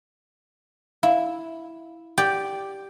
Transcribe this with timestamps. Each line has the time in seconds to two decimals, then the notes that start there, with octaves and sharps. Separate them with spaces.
1.03 E4 F5
2.18 G4 D5